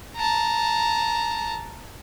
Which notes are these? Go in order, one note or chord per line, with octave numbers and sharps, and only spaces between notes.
A5 A#5